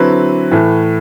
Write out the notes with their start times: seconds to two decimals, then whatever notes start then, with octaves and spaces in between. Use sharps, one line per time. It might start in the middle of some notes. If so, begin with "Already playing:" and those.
Already playing: D3 F#3 C4 E4 B4 B5
0.52 A2 E3 A3